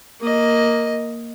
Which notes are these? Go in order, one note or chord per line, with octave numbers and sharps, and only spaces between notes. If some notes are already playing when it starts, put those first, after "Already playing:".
A#3 D#5